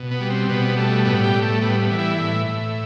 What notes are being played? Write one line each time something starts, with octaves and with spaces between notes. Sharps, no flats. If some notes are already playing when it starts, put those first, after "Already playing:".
Already playing: B2
B3
G3
C4
B2 B3
G3 A3
A2 B3
G4
A2
A3
G3 B3
B3
E3
E4
A2
A2